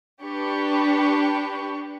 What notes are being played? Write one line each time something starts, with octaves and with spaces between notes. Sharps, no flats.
D4 G4 B4 C#6